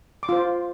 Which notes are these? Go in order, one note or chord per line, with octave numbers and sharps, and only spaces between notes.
D6
F4 C5 C6